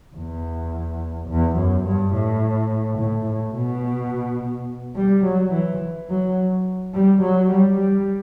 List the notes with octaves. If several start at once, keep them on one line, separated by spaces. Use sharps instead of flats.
E2
E2
F#2
G2
A2
A2
A2
B2
G3
F#3
E3
F#3
G3
F#3
G3
G3